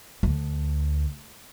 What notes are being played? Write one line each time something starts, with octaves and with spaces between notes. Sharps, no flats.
D2